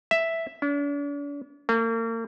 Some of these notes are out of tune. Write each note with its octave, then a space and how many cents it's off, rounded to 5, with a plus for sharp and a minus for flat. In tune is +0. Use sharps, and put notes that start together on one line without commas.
E5 +0
D4 -45
A#3 -40